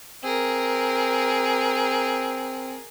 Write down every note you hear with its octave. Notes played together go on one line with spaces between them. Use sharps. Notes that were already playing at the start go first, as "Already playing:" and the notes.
C4 G#4 A#4